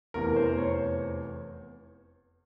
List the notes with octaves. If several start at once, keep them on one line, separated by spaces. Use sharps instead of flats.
F1 E2 E3 A#4
C5
C#5